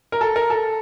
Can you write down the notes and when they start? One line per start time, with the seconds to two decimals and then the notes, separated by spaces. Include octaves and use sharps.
0.12 A#4
0.21 A4
0.36 A#4
0.50 A4